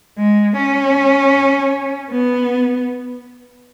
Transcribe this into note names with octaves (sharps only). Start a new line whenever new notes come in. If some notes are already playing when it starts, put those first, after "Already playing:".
G#3
C#4
B3